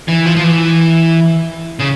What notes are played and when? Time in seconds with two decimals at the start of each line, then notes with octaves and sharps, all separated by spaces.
0.08 E3
0.26 F3
0.36 F3
0.44 E3
1.79 C#3